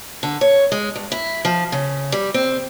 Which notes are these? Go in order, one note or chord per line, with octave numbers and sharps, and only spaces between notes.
D3
C#5
G#3
G2
E4
F3
C#3
G3
C4